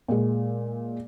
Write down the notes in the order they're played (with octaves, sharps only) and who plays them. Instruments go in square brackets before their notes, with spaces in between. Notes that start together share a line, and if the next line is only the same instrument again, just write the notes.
[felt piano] A#2 G#3